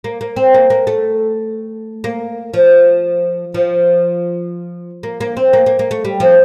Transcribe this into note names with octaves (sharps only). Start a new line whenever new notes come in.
A#3
A#3
C4
A#3
A#3
A3
A#3
F3
F3
A#3
A#3
C4
A#3
A#3
A#3
A3
G3
F3